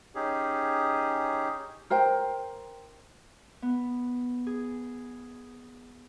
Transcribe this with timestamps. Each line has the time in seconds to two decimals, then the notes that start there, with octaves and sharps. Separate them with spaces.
0.15 C#4 D#4 G4 G#4
1.90 A#4 C5 G5
3.62 B3
4.47 G#4